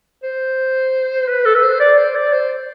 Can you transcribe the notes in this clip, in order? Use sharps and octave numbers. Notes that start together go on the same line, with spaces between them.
C5
B4
A4
B4
C5
D5
C5
D5
C5